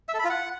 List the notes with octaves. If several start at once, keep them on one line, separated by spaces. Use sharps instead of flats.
E5
A4
B5
F4
F#5